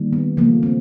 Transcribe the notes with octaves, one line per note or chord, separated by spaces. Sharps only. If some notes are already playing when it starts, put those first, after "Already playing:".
Already playing: D#3 G3 A#3
B3
C#3 F3 A3 A#3
C4